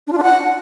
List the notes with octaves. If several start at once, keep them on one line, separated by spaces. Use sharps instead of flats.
D4
F4
D4
F#5